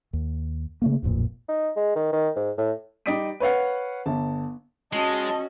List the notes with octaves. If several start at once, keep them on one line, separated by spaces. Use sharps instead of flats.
D#2
C#3 A3 A#3
D1 A1 F2 A#2
D#4
G#3
D#3
D#3
G#2
A2
G3 D#4 D5 D#6 B6 D7
B4 C#5 F5 F#5
G1 A5
G#3 C#4 F#4 D#5 A5